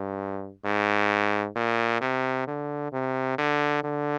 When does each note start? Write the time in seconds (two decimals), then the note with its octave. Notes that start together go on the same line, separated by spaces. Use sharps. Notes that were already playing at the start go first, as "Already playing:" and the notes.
Already playing: G2
0.65 G#2
1.55 A#2
2.01 C3
2.47 D3
2.92 C3
3.38 D3
3.84 D3